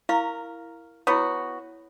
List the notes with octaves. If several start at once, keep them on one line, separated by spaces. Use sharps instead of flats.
E4 A#4 F5 C#6
B3 E4 F#4 C#5